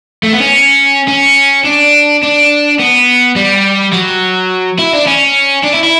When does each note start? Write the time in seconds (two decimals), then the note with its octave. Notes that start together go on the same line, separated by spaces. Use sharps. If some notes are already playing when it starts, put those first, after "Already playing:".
0.23 A3
0.33 B3
0.41 C#4
1.08 C#4
1.65 D4
2.23 D4
2.79 B3
3.36 G3
3.93 F#3
4.79 E4
4.93 D4
5.07 C#4
5.63 D4
5.73 E4
5.83 E4